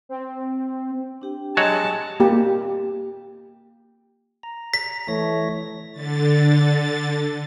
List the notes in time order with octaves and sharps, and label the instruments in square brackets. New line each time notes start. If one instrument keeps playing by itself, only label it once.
[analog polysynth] C4
[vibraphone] D4 G4 G5
[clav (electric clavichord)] F#3 F#4 C#5 [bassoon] G#3 [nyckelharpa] A5
[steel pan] A#3 G4
[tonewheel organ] A#5
[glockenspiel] B6
[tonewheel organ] E3 C#5 A#6 [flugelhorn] A3
[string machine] D3 A6